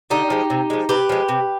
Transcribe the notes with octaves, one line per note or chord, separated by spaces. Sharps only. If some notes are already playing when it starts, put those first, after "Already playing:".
D3 D#4 G4
F3 G#3
C3
F3 G#3
C3 G4 B4
F3 G#3
C3